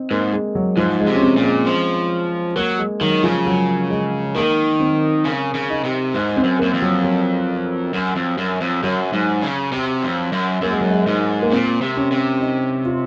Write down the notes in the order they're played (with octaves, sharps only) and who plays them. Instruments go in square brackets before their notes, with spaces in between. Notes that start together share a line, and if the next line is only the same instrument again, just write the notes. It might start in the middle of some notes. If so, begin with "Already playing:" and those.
Already playing: [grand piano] C4 D#4
[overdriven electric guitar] G#2 [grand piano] A#3
[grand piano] G#3
F#3
[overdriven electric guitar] G#2 [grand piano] F3
[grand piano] G#3
[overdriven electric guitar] C3
[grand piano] C#4
C4
[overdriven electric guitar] A#2
[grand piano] G#3
[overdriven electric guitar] F3
[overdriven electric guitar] F#3 [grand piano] A#3
[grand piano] G#3
[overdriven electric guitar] D#3 [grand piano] F#3
[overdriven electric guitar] C#3 [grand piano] F3
[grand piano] F#3
G#3
[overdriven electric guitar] D#3 [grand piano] A#3
[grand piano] C4
[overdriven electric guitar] C#3
C#3
[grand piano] D#4
[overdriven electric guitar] C3
G#2
[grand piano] C4
[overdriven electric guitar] F#2
[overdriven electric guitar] F#2 [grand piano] A#3
[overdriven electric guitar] F2
[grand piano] F#3
F#3
[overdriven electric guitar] F#2
F2
F#2
F2
[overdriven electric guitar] F#2 [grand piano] F#3
[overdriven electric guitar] G#2
C#3
C3
F2
F#2
[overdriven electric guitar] F#2 [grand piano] A#3
[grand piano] G#3
F#3
G#3
[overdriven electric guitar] G#2
[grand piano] A#3
[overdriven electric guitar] A#2 [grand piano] C4
[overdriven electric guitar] C3
[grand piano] C#4
[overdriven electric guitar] C3
[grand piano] D#4
F4